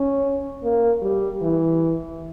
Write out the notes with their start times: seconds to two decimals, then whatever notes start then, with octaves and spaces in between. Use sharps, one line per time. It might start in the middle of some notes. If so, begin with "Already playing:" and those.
Already playing: C#4
0.63 A#3
1.02 G3
1.42 E3